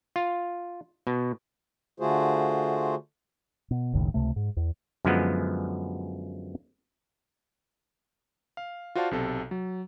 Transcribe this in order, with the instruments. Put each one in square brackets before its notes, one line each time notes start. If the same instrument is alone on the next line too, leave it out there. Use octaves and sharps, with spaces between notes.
[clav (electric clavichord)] F4
B2
[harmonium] D3 A3 F4 F#4 G#4 C5
[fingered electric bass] B2
F#1 C#2 A2 D#3
C#2 C3 A3
G#2
E2
[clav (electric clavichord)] F#2 D3 F3 G#3 B3
[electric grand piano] F5
F4 F#4 C5 D5 F5 A5
B1 C3 A4
F#3